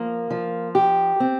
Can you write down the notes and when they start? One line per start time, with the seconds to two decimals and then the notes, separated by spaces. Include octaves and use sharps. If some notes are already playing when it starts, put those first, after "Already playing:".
Already playing: F3 A#3
0.31 F3
0.75 G4
1.20 C4